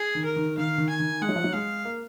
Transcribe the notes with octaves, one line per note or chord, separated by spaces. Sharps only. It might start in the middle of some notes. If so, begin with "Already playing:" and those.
Already playing: G#4
D#3
A#4
D#3
D#3 F5
D#3
G#5
D#3
G#3 F#5
F#3
F3
F#3
G#3 F5
A#3